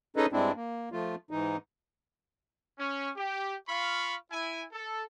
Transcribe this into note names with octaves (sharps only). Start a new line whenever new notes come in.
C#4 D#4 G#4 A4 B4 D#5
G2 G#3 C4 D4 E4
A#3
F3 A3 F4
G#2 E3 D#4
C#4
G4
F4 F5 B5 C#6
E4 G#5
A4